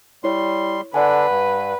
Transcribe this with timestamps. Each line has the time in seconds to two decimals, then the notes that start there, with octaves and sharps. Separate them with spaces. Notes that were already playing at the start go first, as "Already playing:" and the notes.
0.24 G3 E4 C#5 C6
0.94 D3 D4 B4 D5 F#5 G#5
1.29 G2